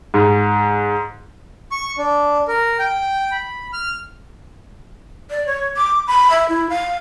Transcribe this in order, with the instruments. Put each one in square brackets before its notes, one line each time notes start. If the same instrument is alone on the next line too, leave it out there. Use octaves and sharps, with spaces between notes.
[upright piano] G#2
[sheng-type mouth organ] C#6
D4
A#4
G5
B5
F6
[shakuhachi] D5
C#5
D6
B5
E5
E4
F5